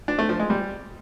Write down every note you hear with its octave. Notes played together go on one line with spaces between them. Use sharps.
D4
A3
F3
G#3
G3